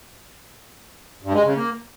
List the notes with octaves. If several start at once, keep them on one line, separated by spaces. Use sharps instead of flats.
G2
G#3
C#3
A#3